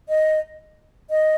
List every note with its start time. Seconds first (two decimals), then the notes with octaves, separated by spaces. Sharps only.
0.09 D#5
1.10 D#5